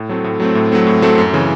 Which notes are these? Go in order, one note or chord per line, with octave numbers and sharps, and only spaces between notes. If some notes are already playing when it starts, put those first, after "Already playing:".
Already playing: A2
F#3 A3 C4
A2
F#3 A3 C4
A2
F#3 A3 C4
A2
F#3 A3 C4
F#2
C#3 E3